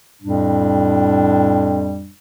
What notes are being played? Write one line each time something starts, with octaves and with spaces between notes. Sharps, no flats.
F2 A2 G3 D4